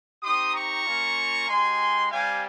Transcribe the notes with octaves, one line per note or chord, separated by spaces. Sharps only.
C4 D#4 G4 C6 D#6
A#5 C#6
A#3 C#4 F4
G#3 D#4 G4 G#5 C6
G3 C4 G4 F5 G#5